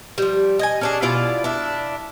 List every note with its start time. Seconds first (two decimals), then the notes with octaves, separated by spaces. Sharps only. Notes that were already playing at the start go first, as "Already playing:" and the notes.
0.18 F3 G3
0.59 D#5 G#5
0.81 C#4 D4 G#4
1.02 B2 E4 F4 D5
1.44 D4 E4